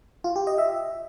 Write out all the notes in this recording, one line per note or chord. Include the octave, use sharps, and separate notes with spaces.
F4
G4
D#5
E5